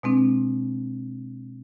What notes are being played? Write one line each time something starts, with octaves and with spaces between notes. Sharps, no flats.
B2 G#3 C4 D4